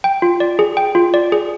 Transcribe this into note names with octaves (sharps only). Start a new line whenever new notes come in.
G5
F4
D5
G#4
G5
F4
D5
G#4